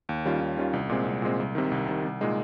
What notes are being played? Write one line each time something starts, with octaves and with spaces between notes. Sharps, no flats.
D#2
D#3 G3 C#4 F4
D#2
D#3 G3 C#4 F4
C2
A#2 G#3 C4
C2
A#2 G#3 C4
C2
C3 D#3
C2
C3 D#3
C2
A#2 G#3 D#4